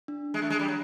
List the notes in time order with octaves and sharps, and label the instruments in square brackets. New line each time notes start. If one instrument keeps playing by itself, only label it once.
[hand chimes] D4
[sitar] G#3
[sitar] A3 [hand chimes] D4
[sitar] G#3
G3
F#3